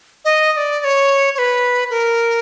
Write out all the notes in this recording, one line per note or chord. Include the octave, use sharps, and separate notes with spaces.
D#5
D#5
D5
D5
C#5
C#5
B4
A#4